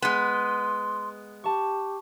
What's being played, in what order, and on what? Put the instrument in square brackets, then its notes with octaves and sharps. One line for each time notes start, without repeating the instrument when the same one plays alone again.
[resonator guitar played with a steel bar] G#3 B3 [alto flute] C6
[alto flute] G4 [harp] A5 C#6